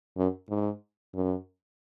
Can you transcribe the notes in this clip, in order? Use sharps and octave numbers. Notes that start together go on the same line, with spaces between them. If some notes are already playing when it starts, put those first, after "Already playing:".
F#2
G#2
F#2